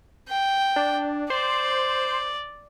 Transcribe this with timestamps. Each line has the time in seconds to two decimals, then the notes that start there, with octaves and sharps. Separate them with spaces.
0.29 G5
0.76 D4
1.30 C5 D5